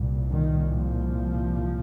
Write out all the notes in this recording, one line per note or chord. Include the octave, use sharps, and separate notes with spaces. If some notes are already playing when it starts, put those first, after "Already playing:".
Already playing: C2 A#2
D#3
F3